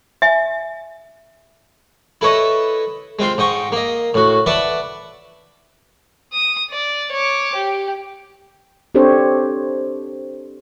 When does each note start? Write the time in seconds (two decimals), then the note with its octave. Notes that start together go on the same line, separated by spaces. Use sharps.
0.22 E5 G#5
2.21 E4 A4 B4 C#5 D#5
3.19 G#3 C4 F4 C6
3.38 G#2 D#5 G5 C#6
3.72 A#3 D#5
4.14 A2 F#4
4.46 B4 D5 E5 F#5 A5
6.33 D#6
6.71 D5
7.11 C#5 D6
7.55 G4
8.95 C4 D4 G4 A4 C5 C#5